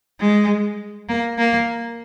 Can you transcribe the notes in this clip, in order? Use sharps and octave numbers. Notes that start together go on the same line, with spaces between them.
G#3
A#3
A#3